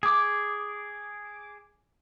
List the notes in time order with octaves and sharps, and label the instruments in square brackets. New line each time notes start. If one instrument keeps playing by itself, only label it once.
[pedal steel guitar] G#4 D6